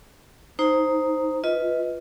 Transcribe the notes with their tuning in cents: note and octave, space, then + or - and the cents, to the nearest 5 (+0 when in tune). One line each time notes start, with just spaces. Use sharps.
D#4 +5 C5 +0 A#5 -10
F4 +0 B4 +0 D#5 +25